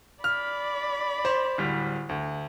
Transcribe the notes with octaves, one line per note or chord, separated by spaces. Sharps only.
D5 B5 F6
C5
D1 G3
D2